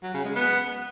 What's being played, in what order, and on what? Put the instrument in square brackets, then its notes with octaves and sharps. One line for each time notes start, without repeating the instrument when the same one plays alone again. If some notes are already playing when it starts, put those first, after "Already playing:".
[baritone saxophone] F#3
C#3
G#3
B3